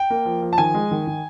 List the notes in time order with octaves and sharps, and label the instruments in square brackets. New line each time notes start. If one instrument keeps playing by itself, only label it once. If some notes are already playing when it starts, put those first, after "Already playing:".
Already playing: [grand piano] G5
A#3
F3
F3
A5
D#3 G#5
G#3
D#3
D#3